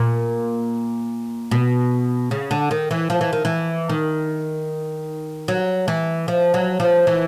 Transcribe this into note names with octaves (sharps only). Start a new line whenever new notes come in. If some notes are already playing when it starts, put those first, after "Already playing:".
Already playing: A#2
B2
C#3
D3
D#3
E3
F3
E3
D#3
E3
D#3
F#3
E3
F3
F#3
F3
E3